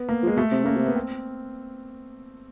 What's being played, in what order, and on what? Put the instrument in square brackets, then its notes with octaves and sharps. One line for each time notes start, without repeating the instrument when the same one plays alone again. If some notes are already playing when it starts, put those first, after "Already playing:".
Already playing: [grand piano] B3
A#3
[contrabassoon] F3
[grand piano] G#3
[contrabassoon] B2 [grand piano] A3
[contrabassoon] C3
[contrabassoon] C#3 [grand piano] A#3
[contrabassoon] C3
[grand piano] B3
C4